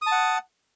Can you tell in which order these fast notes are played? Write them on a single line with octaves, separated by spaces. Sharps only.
D#6 A5 F#5